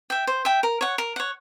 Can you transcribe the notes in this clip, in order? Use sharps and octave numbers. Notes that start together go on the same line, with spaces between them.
E5 G5
C5
E5 G5
A#4
C#5 F#5
A#4
C#5 F#5